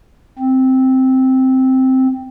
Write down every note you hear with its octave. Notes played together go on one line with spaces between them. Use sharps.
C4